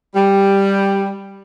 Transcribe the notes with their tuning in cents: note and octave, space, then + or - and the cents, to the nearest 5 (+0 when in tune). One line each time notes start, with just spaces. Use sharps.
G3 +5